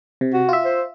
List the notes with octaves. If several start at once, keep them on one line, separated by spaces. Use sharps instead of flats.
C3
F#4
F4 E5
C5